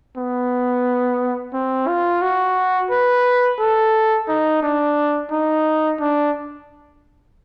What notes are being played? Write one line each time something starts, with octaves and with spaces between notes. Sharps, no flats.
B3
C4
F4
F#4
B4
A4
D#4
D4
D#4
D4